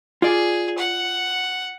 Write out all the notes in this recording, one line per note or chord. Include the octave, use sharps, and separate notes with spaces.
F4 G#4 D5
F#5